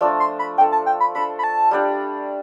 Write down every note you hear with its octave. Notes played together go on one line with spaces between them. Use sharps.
F3 A3 D4 A4 D5
C6
B5
D4 A4 D5 G5
A5
G5
B5
D4 A4 C5 B5
B5
A5
G3 D4 G4 D5